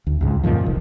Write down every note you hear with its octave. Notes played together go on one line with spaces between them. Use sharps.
D2
C#2 G#2
F#2 A#2 D#3 F3
F1 C2